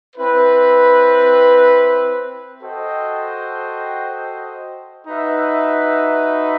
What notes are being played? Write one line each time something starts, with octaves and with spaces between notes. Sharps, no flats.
C4 E4 B4
F#4 A4 C5 D#5 G5
D#4 F#4 B4 E5